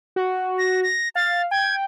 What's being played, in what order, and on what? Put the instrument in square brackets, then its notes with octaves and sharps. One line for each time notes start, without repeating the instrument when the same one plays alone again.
[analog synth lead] F#4
[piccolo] A#6
A#6
[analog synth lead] F5 [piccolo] A6
[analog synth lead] G5 [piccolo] G#6